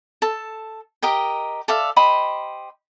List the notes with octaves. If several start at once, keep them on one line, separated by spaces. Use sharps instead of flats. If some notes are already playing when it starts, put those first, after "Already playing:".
A4 A5
G4 A#4 D#5 G5
A4 D5 E5 F5
G4 C5 D#5 B5